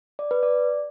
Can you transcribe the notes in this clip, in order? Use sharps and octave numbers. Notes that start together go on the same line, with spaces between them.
D5
B4
D5